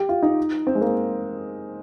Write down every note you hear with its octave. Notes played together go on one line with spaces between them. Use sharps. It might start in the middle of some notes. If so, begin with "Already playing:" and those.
Already playing: G4
F4
D#4
C4
G#3
A#3